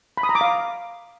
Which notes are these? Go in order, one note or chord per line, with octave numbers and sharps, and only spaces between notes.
B5
D#6
A#5
D6
F5